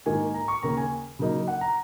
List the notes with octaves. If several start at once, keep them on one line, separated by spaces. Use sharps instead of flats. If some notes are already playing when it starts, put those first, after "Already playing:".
G#2 D#3 A#3 G#5
A#5
C#6
D#2 C#3 A#3 C#4 A#5
G#5
C#3 F#3 A#3 D#4
F#5
A#5